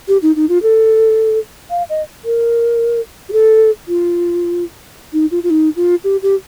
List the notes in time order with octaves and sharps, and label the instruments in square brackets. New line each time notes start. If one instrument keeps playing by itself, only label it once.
[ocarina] G4
D#4
D#4
F4
A4
F5
D#5
A#4
G4
A4
F4
D#4
F4
F4
D#4
F4
G4
G4